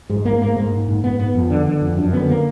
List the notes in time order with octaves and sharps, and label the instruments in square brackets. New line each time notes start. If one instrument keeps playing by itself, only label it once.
[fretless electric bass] G#2 G#3
G#2 A#3
G#2 A#3
G#2 A#3
G#2
G#2
G#2 B3
G#2 B3
F2
D3
D3
F2
F#2 D4
D3 B3
D3 A#3